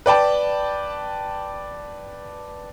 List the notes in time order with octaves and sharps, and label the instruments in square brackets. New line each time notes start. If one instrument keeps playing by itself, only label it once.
[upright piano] B4 D5 G5 A5